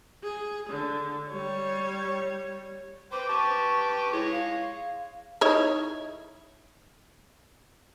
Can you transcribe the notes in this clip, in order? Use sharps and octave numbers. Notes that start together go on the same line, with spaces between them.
G#4
D3
G3 C#5
B4 C5 G5 D6
G4 B4 A5 C#6
G#3 E4 C#5
F5
D#4 E4 C#5